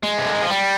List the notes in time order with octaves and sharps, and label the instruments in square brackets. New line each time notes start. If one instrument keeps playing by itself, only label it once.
[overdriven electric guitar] G#3
C3
D3
D#3
F3
G3